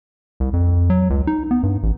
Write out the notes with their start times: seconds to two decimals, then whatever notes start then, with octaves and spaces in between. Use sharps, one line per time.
0.40 C2
0.53 F2
0.90 F#3
1.10 C#2
1.27 D#4
1.51 B3
1.63 G2
1.83 A1